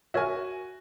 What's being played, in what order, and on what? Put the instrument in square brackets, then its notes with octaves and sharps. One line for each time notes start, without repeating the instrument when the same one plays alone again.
[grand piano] F#4 G#5 [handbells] A#4 C#5 E5